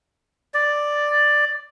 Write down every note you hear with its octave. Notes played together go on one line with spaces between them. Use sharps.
D5